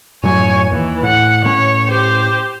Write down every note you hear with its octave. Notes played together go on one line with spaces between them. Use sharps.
F#2 A2 F#3 C#5 G#5
D#2 E3
A2 F#5
A2 G3 C#4 C#5
G4 C5